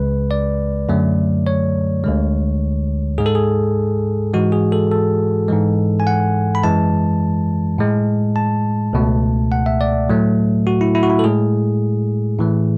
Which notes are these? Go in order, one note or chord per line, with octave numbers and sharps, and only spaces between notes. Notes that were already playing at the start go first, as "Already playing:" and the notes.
Already playing: C#2 C#3 G#3 B4
D5
F#2 D3 F#3 A3
C#5
D2 D3 G#3
G#2 G#3 G#4
A4
G#4
G#2 E3 G#3 F#4
G#4
A4
A4
G#2 E3 G#3
G#5
F#5
B5
F#2 E3 G#3 A5
A2 G#3
A5
C#2 B2 A3
F#5
E5
D5
A2 F#3 A3
F#4
E4
E4
F#4
E4
A4
A2 G#3 G#4
A2 E3 A3